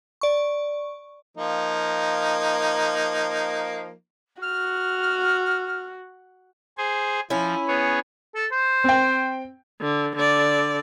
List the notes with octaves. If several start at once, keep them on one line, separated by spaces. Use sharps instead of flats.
D5 C#6
F3 A#3 D#4
F#4 F6
G#4 C5 G#5
F3 C#4 E4
B3 G#4 C#5
A4
C5
C4 G5
D3
D3 D5